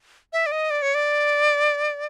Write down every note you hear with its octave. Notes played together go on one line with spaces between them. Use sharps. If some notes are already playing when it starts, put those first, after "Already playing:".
E5
D5
D#5
D5
C#5
D5